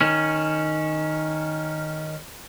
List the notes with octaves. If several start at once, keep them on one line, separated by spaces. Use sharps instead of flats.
D#3 C#4